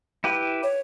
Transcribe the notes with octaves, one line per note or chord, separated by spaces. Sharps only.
E4 G4 B4
C#5